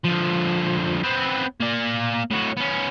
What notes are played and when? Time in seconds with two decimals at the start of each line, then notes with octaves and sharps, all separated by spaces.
0.04 D3 F3
1.03 B3 C4
1.61 A#3 D5
2.31 A2 F#4
2.57 B3 C#4